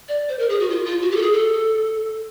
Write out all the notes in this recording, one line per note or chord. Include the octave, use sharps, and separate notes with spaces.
D5
C5
A#4
G#4
F#4
F4
F4
F#4
G4
A4
G#4
A4